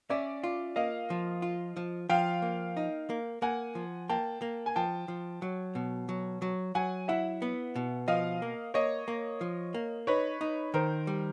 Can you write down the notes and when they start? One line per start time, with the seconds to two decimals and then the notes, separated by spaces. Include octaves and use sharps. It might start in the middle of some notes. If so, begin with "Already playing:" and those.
0.10 C#4 D5 E5
0.44 F4
0.76 A#3 D#5 F5
1.10 F3
1.42 F4
1.77 F3
2.09 F3 F5 G5
2.42 A#3
2.77 D#4
3.10 A#3
3.42 A#3 F#5 G#5
3.75 F3
4.09 A#3 G5 A5
4.42 A#3
4.66 G#5
4.76 F3 G5 A5
5.08 F3
5.42 F#3
5.75 B2
6.09 F#3
6.42 F#3
6.75 F#3 F#5 G#5
7.08 E4 E5 F#5
7.42 B3
7.76 B2
8.08 F3 D#5 F5
8.42 A#3
8.74 A#3 C#5 D#5
9.08 A#3
9.41 F3
9.74 A#3
10.07 D#4 B4 C#5
10.41 D#4
10.74 D#3 A#4 C5
11.07 G3